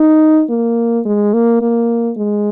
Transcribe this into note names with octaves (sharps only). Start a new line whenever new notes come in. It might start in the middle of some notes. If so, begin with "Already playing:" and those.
Already playing: D#4
A#3
G#3
A#3
A#3
G#3